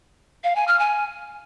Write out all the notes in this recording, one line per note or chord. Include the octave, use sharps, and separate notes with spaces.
F5
G#5
F6
G#5